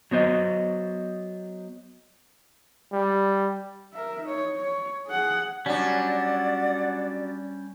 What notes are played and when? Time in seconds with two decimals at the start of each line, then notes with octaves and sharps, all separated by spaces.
0.11 F#3 B3 C5 D#5
2.93 G3
3.93 A#4 E5
4.23 D#4 C#5
4.56 C#5
5.07 G#4 F#5
5.66 F#3 G3 C#4 D4 D5 F#5